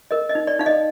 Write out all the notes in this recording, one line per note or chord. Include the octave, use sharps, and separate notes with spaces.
A#4 D#5
D#5
D#4
D5
D#4 F5
D#5